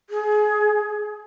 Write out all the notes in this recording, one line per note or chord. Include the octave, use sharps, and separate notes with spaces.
G#4